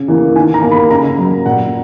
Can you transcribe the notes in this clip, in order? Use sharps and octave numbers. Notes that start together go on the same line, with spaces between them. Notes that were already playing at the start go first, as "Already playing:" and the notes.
Already playing: C#3
E3 A#3
D#3 G#5
A#5
A#3
B5
C#3 A#5
F#3 A#3
A#2 F#5